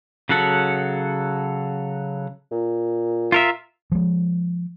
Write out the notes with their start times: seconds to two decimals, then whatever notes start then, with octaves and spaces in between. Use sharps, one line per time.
0.29 C#3 F#3 F#4 A4 F#5
2.51 A#2
3.32 F4 A#4 E5
3.92 F3 G#3